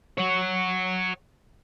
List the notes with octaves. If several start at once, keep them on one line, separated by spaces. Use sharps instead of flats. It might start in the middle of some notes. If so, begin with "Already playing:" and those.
C#5 F#5